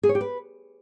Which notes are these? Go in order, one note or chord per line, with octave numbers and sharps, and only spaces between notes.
G#4
C#5
G4
B4